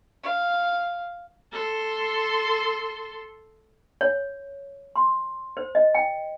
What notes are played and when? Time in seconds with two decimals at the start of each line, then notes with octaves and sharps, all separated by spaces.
0.23 F5
1.53 A4 C6
4.01 C#5
4.96 C6
5.57 C5
5.75 D#5
5.95 G5